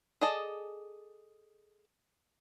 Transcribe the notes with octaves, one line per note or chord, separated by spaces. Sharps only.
G#4 A4 D5 D#5 A5